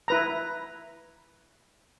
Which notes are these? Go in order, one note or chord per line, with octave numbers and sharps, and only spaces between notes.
E4 B4 A#5